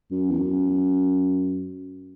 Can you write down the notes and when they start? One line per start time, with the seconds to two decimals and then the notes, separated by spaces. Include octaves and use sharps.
0.11 F#2
0.30 E2
0.39 F#2